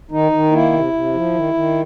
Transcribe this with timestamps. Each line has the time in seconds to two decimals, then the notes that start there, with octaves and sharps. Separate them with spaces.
0.11 D#3 D#4
0.32 D#3
0.52 A#3 E4
0.72 C3
0.93 C3
1.13 F3
1.34 D#3
1.54 D#3